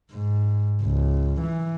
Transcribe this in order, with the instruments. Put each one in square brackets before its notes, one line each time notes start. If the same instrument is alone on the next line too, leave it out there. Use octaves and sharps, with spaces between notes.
[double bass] G#2
C#2
E3